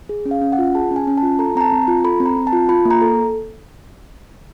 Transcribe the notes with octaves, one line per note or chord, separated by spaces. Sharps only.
G#4
C#4
F5
C#4
F#5
F4
G#4 A5
C#4
G#5
C#4
A5
F4
A4 A#5
C4 A#5
A5
C4
A#5
F4
A4 B5
C4
A#5
C4
A5
F4
F4 B5
A#3
A#5
A4